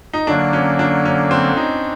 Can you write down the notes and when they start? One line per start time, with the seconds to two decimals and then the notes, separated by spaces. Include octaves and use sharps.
0.13 D#4
0.27 D3 F#3 A#3 D4
0.53 C#4
0.79 D4
1.05 C#4
1.31 C4
1.57 D#4